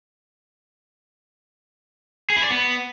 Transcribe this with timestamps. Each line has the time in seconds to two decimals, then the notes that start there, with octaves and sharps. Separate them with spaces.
2.30 G#4
2.37 E4
2.44 D5
2.50 B3